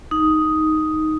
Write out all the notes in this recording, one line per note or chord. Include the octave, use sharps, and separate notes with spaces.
D#4